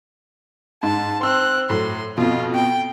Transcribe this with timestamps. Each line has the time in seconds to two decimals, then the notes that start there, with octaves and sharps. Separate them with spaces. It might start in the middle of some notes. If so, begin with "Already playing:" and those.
0.83 G#2 A5
1.21 C4 C6 E6 F#6
1.70 A2 F#3 C6
2.18 F2 B2 F4
2.55 G5